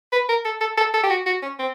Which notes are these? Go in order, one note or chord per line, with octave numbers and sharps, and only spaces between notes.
B4
A#4
A4
A4
A4
A4
G4
F#4
F#4
C#4
C4